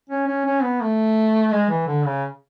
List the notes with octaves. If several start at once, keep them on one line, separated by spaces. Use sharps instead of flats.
C#4
C#4
C#4
B3
A3
G#3
E3
D3
C#3